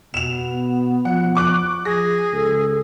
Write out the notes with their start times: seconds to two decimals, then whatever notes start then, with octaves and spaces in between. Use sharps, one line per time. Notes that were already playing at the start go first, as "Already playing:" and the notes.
0.14 B2 B3 E7 F7
1.05 F3 F#5
1.35 C#6 D6 F#6
1.85 F3 G#4 A#6
2.32 C#2 A4